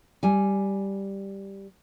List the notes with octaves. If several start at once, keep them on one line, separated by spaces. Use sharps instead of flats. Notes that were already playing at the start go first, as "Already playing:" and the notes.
G3 G#5